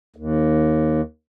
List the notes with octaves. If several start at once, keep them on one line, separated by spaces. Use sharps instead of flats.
D#2